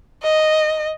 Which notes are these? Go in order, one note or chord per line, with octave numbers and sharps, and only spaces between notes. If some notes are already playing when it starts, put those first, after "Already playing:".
D#5